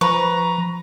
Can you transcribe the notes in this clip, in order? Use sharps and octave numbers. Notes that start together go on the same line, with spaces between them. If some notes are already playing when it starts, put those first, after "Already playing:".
F3 B4 A#5 C#6